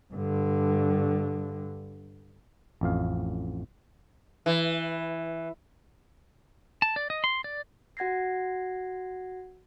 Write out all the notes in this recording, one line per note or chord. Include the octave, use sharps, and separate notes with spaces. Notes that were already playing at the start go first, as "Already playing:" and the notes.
G2 D3
A1 F2 F5
E3
A5
D5
D#5
C6
D5
F#4 F#5 G#6 A#6 C7